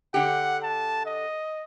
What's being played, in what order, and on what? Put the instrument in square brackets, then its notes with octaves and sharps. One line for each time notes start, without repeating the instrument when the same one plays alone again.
[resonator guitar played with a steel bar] D3 G4 [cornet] F#5
[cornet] A5
D#5